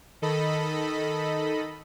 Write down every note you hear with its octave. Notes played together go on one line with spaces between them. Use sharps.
D#3 A4 D#5 B5